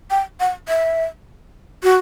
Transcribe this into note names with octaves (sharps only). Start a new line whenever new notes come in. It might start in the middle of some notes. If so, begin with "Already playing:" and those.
G5
F#5
E5
F#4